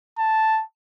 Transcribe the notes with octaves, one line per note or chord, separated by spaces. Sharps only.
A5